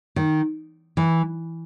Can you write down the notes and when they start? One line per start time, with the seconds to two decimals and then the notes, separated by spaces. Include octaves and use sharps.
0.16 D#3
0.97 E3